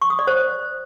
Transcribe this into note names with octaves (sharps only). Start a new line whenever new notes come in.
C#6
D#6
D5
C5